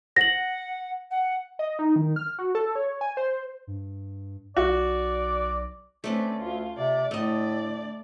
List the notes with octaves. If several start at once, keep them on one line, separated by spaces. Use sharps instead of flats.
F#5 A#6 F#7
F#5
D#5
D#4
D#3
F6
F#4
A4
C#5
G#5
C5
G2
B1 F#4 D5
D2 A3 C4 C#4 B4 D5
D2 F4
C3 D5
D2 A2 A3 D5 D#5